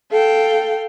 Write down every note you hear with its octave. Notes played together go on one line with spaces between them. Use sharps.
A4 F5 G5